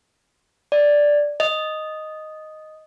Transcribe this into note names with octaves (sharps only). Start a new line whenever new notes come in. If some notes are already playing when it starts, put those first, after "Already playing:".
D5
D#5